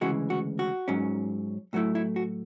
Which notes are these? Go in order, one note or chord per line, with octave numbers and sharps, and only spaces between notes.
D2 C#3 E3 G#3 F#4
F#4
F#4
G#2 F#3 C#4
A2 F#3 A3 E4 F#4
E4
F#4